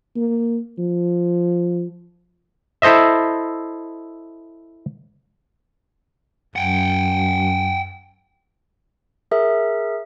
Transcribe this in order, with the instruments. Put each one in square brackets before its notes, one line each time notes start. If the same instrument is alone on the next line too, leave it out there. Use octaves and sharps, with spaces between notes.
[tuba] A#3
F3
[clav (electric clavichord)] E4 A4 C5 D#5 E5
[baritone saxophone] F#2 [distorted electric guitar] F#5 G5
[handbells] G#4 A#4 E5